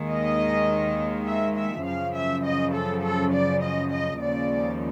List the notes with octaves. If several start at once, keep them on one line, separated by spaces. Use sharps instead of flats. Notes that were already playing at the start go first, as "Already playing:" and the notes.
Already playing: D#2 D#3 G#3
D#5
E5
E5
F#2 C#3 F3 F5
E5
D#5
A4
A4
D5
D#5
D#5
D#2 C#3 F3 G#3 D5